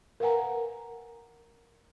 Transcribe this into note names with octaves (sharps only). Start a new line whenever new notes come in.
A#4 B4 F5 F#5 G#5 A#5